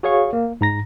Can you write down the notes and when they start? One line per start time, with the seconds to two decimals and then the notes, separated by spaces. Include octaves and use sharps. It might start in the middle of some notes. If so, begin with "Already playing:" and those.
0.03 F#4 G#4 C#5 F5 C#6
0.33 A#3
0.61 G#2 A#5 A#6